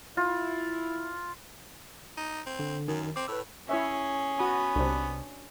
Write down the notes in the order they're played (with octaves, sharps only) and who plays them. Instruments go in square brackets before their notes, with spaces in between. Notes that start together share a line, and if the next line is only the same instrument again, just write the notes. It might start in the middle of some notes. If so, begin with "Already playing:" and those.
[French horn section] E4 [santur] F4
[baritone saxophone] D#4
C4
[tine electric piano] D3
[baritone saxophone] F#2 [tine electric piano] D#3
[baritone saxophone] C4 [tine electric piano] D6
[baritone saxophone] A2 [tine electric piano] B4 E6
[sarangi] C#4 [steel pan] E4 C#5 E5 [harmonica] G#4
[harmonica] B3 B4 [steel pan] F#4 D#6
[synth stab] C2 C3 [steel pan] D4